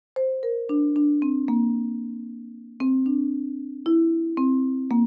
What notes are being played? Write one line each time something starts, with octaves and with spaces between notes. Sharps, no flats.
C5
A#4
D4
D4
C4
A#3
C4
D4
E4
C4
A#3